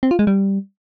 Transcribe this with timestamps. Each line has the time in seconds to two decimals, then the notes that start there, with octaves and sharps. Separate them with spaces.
0.03 C4
0.11 F4
0.19 G#3
0.27 G3